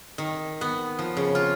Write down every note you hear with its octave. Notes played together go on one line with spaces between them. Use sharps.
D#3
B3
F3
C#3
F4